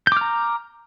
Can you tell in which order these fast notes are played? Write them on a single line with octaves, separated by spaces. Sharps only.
G6 D6 F6 A#5